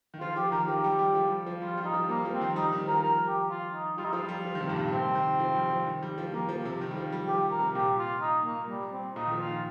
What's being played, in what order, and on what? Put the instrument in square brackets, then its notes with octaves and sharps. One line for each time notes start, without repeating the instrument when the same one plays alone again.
[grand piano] D#3
[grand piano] F3 [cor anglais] F4
[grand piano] F3 [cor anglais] G4
[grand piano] D#3 [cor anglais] A#4
[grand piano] F3 [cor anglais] G4
[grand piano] G3
G3
F3
G3
F3
[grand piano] G3 [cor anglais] F4
[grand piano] G3 [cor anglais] F4
[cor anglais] D#4
[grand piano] F3
[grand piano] G3 [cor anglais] A#3
[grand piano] F3
[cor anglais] C4
[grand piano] D#3
[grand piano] G3 [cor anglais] D#4
[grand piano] D#3
[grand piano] F3 [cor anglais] A#4
[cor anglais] A#4
G4
F4
D#4
[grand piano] G3 [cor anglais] F4
[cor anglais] D#4
[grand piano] F3 [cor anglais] F4
[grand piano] G3
F3
D#3
C3
G2
A#2
[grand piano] C3 [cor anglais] C4
[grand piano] D#3
F3
G3
F3
D#3
G3
F3
[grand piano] F3 [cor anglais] A#3
[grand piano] F3
C3
D#3
G3
F3
G3
[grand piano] F3 [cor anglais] G4
[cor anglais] A#4
[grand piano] C3
[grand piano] A#2 [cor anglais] G4
[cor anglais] F4
D#4
A#3
G3
C4
[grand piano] A#2 [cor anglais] D#4
[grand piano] D#3
F3
[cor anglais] F4
[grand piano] A#2